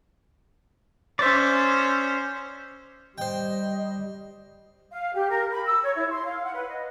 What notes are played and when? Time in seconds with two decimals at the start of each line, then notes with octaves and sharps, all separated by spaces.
1.19 C#4 C5 D5 E5
3.18 G3 C5 D#5 G5
4.91 F5
5.14 G4
5.30 A#4
5.52 B5
5.66 E6
5.83 C#5
5.96 E4
6.10 C6
6.25 F5
6.42 F#5
6.54 B4
6.68 D#5